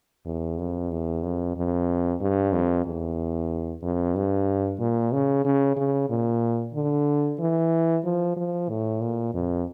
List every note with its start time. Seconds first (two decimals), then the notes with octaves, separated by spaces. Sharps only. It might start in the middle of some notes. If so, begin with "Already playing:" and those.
0.26 E2
0.58 F2
0.91 E2
1.23 F2
1.56 F2
2.21 G2
2.53 F2
2.86 E2
3.83 F2
4.15 G2
4.80 A#2
5.12 C#3
5.45 C#3
5.77 C#3
6.10 A#2
6.74 D3
7.40 E3
8.04 F3
8.37 F3
8.69 A2
9.01 A#2
9.34 F2